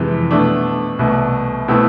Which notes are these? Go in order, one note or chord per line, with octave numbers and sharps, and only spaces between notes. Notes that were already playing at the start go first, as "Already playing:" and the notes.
Already playing: F2 C3 E3 G#3
B2 A3 D4
C2 B2 A3
B2 A3 C4 E4